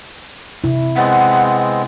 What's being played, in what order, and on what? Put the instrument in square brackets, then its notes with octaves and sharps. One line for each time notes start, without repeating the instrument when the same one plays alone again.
[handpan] C3 E4
[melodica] G#3 B3 C4 [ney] F#5